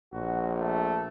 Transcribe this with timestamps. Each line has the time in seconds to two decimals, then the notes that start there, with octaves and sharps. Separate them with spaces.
0.13 A#1 F#4
0.60 A3